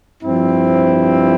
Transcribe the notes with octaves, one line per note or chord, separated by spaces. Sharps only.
G2 F3 C4 E4